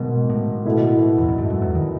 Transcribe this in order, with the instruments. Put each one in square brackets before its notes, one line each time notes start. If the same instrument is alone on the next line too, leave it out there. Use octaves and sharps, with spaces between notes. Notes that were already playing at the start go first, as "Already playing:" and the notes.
Already playing: [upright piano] G#2 D#3 F#3 [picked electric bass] B2
[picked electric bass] A2
[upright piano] B2 A3 E4 A4
[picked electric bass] E2
F#2
G#2
F#2
E2
D#3